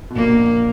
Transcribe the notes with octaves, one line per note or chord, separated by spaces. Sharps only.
B2
A#1 A#2 A#3